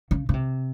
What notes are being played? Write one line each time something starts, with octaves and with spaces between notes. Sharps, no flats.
C#3
C#3
C3